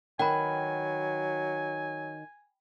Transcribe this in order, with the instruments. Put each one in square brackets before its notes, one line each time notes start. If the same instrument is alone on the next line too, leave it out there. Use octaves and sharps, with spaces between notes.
[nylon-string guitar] D#3 F#4 B4 [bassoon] F#3 [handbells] G5 B5 [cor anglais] G#5